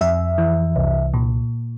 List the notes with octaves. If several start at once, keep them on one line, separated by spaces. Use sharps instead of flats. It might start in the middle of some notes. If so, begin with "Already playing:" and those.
F2 E5
E3
C2
A#2